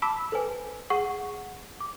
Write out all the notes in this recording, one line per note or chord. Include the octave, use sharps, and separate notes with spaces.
A5 B5 D6 E6 B6
A4 B4 C5 G#5
G#4 F#5 C#6
D6